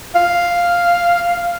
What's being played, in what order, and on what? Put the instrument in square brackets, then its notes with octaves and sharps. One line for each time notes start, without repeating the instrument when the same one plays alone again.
[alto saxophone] F5